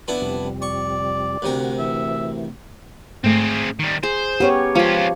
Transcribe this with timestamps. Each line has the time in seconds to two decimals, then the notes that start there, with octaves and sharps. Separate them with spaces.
0.08 B3 D4 E4
0.22 F2 C3 G3
0.62 D5 C#6
1.42 D2 C3 F#4 A#4
1.79 E3 E5
3.24 G#2 A3 C4 G#4
3.79 D#3 G3
4.03 G#4 C5
4.40 B3 C#4 G4 A#4 C#5
4.75 F3 G#3 C#4 F4 B5